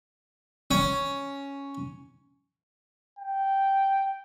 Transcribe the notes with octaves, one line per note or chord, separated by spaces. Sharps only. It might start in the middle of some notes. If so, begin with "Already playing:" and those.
C#4
G5